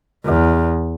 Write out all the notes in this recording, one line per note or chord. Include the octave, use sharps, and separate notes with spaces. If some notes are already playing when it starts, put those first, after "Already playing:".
E2